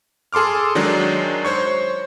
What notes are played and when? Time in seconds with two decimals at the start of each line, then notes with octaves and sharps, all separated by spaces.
0.33 G#4 A4 C6 D6 F6
0.75 D#3 F#3 G#3 D4 D#4
1.45 C5 C#5 C#6